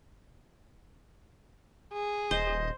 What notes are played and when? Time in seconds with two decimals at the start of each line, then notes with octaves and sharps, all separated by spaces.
1.93 G#4
2.31 D#1 C5 D#5